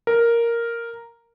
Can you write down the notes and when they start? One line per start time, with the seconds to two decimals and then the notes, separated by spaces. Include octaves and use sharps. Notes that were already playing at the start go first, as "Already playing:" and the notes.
0.07 A#4